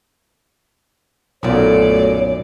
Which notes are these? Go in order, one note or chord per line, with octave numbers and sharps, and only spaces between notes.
B1 F#2 A#2 A3 F4 F#4 C#5 D5